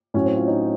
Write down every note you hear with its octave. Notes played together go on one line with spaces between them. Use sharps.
A2 F#3 C#4
C4
F4
D#4